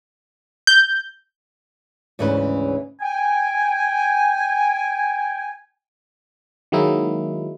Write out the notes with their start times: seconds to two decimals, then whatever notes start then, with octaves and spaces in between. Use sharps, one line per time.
0.67 G6
2.19 D2 G#2 C#3 E3 C#4 B4
3.01 G5 G#5
6.72 D#3 F#3 G#3 A#3 D#4 E4